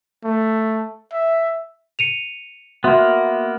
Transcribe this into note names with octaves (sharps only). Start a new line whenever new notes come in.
A3
E5
C#7 D#7 F7
A#3 B3 F#4 E5 C6